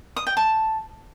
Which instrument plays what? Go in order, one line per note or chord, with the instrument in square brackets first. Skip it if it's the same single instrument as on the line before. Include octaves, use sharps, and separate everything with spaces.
[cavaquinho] D#6
G5
A5